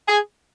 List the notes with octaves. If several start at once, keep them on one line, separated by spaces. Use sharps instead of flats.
G#4